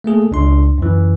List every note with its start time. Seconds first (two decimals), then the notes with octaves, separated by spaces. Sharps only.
0.04 A3 A#3 G#4 A4
0.31 C#2 D4 C6
0.78 F#2 E3